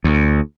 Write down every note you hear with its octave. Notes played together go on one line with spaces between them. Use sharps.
D2